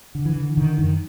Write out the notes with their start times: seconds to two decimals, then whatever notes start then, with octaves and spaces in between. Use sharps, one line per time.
0.15 D3
0.25 E3
0.36 D3
0.57 D3 D#3
0.78 F#2 D#3